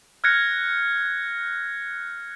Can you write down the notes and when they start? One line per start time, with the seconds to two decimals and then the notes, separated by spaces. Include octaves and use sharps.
0.24 F6 F#6 G#6 A#6 C#7